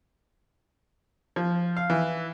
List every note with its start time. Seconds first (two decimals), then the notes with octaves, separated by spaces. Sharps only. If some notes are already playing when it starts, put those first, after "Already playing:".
1.36 F3
1.77 F5
1.90 E3